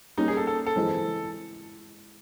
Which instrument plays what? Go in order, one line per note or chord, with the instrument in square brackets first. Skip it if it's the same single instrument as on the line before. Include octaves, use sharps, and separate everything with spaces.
[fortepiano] G3 A#3 C#4 [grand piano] D#4
[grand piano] G#4
A4
A4
A4
[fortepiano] E3 G#3 C4